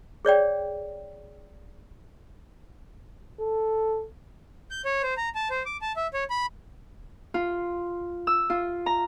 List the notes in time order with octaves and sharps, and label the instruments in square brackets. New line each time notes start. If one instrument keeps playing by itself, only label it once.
[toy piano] G#4 C#5 D5 G5
[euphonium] A4
[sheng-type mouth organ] G6
C#5
C5
A#5
A5
C5
D6
A5
E5
C#5
B5
[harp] F4
E6
F4
A#5